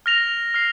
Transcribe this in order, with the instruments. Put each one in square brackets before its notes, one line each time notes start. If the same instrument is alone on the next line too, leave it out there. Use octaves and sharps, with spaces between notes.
[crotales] F6 A#6 F7
F6 C7